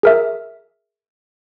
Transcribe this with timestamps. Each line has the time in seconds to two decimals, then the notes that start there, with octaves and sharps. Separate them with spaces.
0.03 G#4 A#4 E5